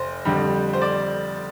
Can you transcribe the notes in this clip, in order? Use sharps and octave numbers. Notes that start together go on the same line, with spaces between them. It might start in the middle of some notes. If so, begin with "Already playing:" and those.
Already playing: F1 C5
F2 D3 G3
C5
D5